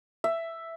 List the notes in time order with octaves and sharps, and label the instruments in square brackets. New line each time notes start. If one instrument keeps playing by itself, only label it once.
[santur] E5